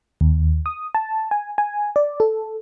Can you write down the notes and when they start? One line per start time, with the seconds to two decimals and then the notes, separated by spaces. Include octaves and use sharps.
0.21 D#2
0.66 D#6
0.95 A5
1.31 G#5
1.58 G#5
1.96 D5
2.20 A4